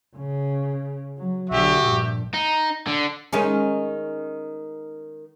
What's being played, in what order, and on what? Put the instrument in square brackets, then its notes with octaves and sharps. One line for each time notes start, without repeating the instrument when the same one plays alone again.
[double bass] C#3
F#3
[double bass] B1 D3 [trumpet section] F#4 G4 E5
[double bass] A#1 G2
[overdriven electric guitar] D#4
D3
[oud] D#3 G#3 C#4